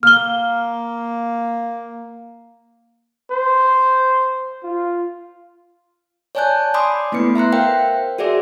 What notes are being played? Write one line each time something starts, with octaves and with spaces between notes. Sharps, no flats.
A#3 F6 G7
C5
F4
C#5 D5 G#5 A5 F#6 G6
D5 G#5 B5 C6 D6 D#6
A3 B3 E4 B4 C#7
E5 A#5 C6 F#6
A#4 C5 E5 F5 G5
F#4 G#4 C5 D5 E5 D6